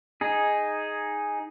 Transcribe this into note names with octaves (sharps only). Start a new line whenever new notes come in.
D#4 G#4